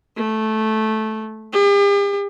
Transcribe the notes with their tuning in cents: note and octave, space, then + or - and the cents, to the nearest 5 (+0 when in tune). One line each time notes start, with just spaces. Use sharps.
A3 -10
G4 +45